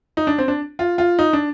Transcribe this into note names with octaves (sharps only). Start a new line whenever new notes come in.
D#4
D4
C4
D4
F4
F4
D#4
D4